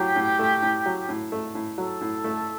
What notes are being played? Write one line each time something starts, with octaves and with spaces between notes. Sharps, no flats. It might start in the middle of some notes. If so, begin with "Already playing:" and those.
Already playing: A2 F#3 G4
A2
A3
A2
F#3
A2
A3
A2
F#3 A4
A2
A3